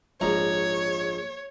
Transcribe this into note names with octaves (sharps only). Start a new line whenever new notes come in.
A#1 G#2 C#5 A#5